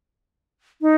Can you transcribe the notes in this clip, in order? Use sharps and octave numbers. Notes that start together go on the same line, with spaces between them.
D#4